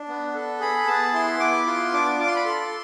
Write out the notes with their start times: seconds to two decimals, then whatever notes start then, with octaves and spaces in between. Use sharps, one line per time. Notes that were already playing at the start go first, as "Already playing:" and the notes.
Already playing: D4
0.09 B3
0.34 A4
0.60 G#4 B5
0.87 B3 A5
1.13 E4 C6
1.40 B3 D6
1.67 F4 C6
1.93 D4 D6
2.19 F4 D6
2.27 C6
2.36 B5
2.44 A4 C6